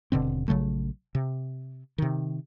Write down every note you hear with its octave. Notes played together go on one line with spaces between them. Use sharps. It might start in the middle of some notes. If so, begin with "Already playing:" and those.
D#1 B2 D3 C4
A#1 C#3 F#3 A3
C3
C3 D#3